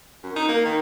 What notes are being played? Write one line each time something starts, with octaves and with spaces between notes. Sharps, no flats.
F#2
D#4
A#3
D#3